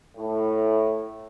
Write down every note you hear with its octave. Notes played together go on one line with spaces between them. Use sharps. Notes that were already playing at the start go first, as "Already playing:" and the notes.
A2